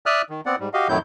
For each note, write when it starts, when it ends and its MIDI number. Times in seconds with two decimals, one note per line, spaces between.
0.06 0.22 74
0.06 0.22 76
0.06 0.22 87
0.06 0.22 89
0.06 0.22 90
0.30 0.41 51
0.46 0.56 59
0.46 0.56 60
0.46 0.56 74
0.46 0.56 78
0.60 0.69 44
0.60 0.69 55
0.74 0.88 66
0.74 0.88 67
0.74 0.88 75
0.74 0.88 77
0.89 0.99 41
0.89 0.99 45
0.89 0.99 51
0.89 0.99 54
0.89 0.99 64
0.89 0.99 91